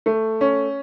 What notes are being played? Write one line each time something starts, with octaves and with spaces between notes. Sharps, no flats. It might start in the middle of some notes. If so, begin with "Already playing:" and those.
A3
C#4